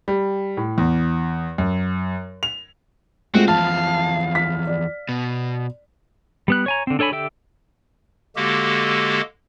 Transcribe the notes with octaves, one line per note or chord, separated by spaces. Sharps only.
G3
A2
E2
F#2
F7
G#3 A3 C4 F4 F#4
E2 F3 F5 A5
B6
D5
B2
G3 B3 F#6
C#5 G#5 A#5
D3 C4
D4 A4 C#5 G#5 B5
D3 G4 A4 E5 G5
D3 G#3 A#3 F#4 G4 A4